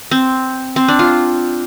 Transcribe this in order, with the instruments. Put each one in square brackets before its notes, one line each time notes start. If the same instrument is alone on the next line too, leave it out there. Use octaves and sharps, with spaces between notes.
[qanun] C4
C4
D4
F4